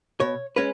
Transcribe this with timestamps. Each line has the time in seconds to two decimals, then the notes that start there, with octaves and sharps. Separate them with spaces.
0.20 B2 C#5
0.56 G#3 C#4 B4